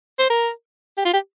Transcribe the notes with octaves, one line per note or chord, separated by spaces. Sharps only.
C5
A#4
G4
F4
G4